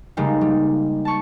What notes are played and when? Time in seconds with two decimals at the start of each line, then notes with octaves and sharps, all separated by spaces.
0.17 C#3 G3 G#3 A#3 D#4
0.41 G3
1.05 A5 C#6